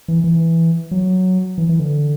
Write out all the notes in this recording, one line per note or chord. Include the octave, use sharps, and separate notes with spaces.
E3
E3
F#3
E3
E3
D3